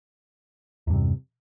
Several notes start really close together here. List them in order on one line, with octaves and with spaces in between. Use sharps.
E2 G2 C3